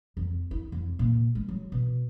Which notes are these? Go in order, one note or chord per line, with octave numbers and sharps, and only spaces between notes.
F2
E4
F2
A#2
G#3
F#3
B2